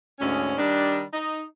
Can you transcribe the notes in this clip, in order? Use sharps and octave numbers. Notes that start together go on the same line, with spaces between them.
D2 G#2 C#4
D#3 G3 D4
D#4